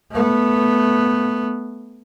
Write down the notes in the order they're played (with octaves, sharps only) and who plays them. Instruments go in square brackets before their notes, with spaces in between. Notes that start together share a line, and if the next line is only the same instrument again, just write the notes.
[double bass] A3 B3